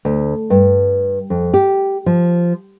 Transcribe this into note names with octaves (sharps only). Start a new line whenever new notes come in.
D2
G2
F2
G4
F3